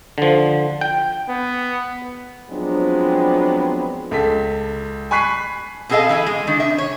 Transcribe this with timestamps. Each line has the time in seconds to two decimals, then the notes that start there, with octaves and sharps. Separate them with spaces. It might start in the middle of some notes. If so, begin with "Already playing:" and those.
0.18 D3 F3
0.81 G5
1.28 B3
2.50 F3 F#3 G#3 B3 C4 D4
4.11 C#2 A4 B6
5.11 G#5 B5 C#6 F#6 B6 C7
5.89 B2 C4 G#4 A4 D#5 F5
6.09 E3 E4 G#4
6.27 G#3
6.47 D#3 D4
6.60 C3 E5
6.78 C#5